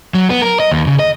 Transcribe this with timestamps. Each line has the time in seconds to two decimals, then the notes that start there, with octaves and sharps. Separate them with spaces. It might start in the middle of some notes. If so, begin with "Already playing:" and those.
0.14 F#3
0.30 B3
0.42 A#4
0.60 D#5
0.71 D#2
0.87 C#3
0.99 D#5